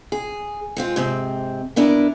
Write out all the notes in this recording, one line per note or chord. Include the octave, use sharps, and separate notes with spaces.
G#4
G#3 C4 F4
G#2 C3 C4
C#3 B3 D4 E4 A#4